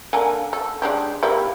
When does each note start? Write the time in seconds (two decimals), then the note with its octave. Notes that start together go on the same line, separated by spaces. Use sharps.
0.13 D3 A#3 G#5
0.53 A4
0.82 G#3 D4 G4
1.23 G3 A#3 E4